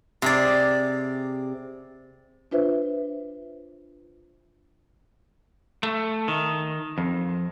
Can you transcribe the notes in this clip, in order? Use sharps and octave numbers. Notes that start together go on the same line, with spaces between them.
C3 G#4 D5
D4 F4 B4 C5 E5
A3
D#3
F2